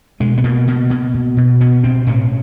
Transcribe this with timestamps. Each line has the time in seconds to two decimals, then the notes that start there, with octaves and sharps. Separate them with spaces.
0.20 B2 G#3
0.38 B3
0.44 B2 A#3
0.67 B2
0.90 B2
1.14 B2
1.37 B2
1.61 B2 B3
1.84 B2 C4
2.07 A2 C#4